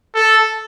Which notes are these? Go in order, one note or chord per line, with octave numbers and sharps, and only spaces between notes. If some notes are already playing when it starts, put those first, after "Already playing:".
A4